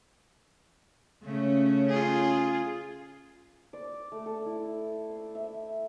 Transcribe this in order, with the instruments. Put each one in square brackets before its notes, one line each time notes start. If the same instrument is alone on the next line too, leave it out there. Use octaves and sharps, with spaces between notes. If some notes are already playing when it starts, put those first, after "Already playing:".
[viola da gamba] C#3 A3 C#4
[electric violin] F4 G#4
[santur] D5
A3
A4
E4
C6
E5